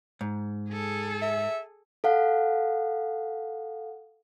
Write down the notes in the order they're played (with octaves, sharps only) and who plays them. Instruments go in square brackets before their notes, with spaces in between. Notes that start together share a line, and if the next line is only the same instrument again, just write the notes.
[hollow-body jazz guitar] G#2
[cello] G#4 A4
[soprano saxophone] E5
[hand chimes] A4 F5 F#5